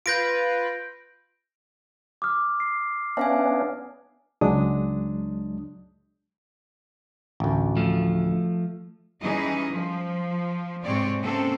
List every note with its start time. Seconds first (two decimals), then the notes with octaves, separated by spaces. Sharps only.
0.06 F4 B4 G6 A#6 D7
2.22 D6 D#6 F6
2.60 C7
3.17 B3 C#4 D4 E5 F5 G#5
4.41 C#2 F#3 G#3 D4 D#6
7.40 A1 D2
7.77 F3 A3
9.22 E3 G3 C#4 D#4 G#4 D#5
9.72 F3
10.84 G#2 C3 C4 C#5 D5
11.21 C3 A#3 C4 C#4 A4